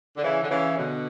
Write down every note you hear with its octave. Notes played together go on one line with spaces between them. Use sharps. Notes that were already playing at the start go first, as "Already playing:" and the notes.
D3
C#3 E3
D3
C#3 E3
B2 D3